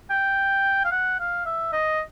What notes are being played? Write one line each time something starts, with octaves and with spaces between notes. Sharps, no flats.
G5
F5
F#5
F5
E5
D#5